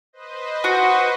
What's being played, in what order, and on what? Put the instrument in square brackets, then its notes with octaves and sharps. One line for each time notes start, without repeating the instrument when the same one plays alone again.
[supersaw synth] B4 C5 D#5
[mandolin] F#4